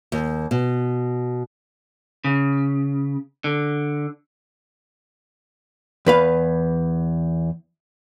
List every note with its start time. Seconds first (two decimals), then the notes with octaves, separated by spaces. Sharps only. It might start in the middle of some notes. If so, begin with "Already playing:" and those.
0.12 D#2
0.51 B2
2.24 C#3
3.44 D3
6.06 E2 B4 F5